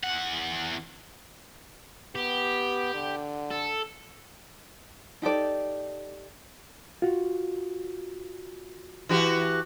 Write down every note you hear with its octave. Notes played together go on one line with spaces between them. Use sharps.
E2 F#5
B3 G4
D3
A4
D#4 G4 A4 D5
F4 F#4
E3 F#4 G4